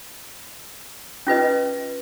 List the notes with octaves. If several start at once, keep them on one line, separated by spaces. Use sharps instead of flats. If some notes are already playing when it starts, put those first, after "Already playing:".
C#4 F4 B4 D#5